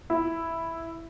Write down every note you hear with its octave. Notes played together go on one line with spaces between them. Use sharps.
E4